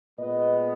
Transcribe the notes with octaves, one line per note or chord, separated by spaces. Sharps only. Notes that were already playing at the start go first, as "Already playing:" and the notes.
A#2 G#3 B3 B4 D#5